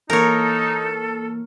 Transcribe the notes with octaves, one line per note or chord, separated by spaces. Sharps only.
E3 A#3 D#4 A4 A#4 C#5